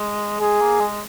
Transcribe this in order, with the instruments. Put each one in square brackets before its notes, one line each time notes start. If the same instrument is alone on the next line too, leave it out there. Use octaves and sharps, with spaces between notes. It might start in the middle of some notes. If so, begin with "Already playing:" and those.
Already playing: [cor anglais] G#3
[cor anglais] G#3 [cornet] G#4
[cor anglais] A#3
G#3